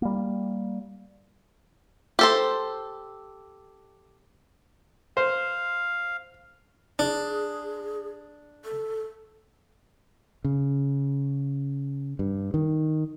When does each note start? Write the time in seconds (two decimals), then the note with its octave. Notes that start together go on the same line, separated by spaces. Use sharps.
0.02 G3 A#3
2.19 G4 A4 C5
5.17 C5 F5
6.99 D4 G#4
8.65 A4
10.44 C#3
12.19 G2
12.54 D#3